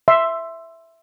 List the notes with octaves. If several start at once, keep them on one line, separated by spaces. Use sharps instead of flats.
E5 C6